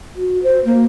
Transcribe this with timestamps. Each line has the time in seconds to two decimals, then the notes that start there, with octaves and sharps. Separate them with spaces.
0.15 F#4
0.43 C5
0.65 A#3